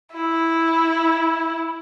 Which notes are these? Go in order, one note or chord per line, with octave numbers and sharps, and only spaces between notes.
E4